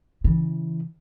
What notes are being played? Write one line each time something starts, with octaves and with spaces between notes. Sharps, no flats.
C#3 E3